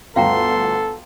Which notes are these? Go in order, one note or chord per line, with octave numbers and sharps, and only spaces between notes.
G1 D2 A4 F5 G5 A#5 C6